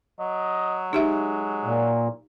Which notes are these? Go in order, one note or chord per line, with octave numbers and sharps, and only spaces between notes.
F#3 D#5
G#3 D#4 G4 E5
A#2